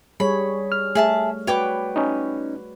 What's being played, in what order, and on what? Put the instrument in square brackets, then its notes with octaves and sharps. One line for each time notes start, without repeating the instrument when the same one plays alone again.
[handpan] G3 G#4 C#5 [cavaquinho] B5
[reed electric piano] F6
[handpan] A3 [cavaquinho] G#4 E5 A5
[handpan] F#4 B4 D5 [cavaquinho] C#5 G5 D6
[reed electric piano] C#4 D#4